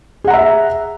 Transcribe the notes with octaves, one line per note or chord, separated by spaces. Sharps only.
G#4 E5 F#5 A#5